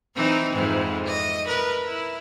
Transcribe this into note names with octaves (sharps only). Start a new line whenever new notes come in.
E3 C4 D#4
F2 G#2 E3
D#5
A#4 B4
E4